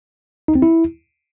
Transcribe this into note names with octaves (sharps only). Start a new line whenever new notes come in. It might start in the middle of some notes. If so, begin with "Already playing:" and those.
D#4
C4
E4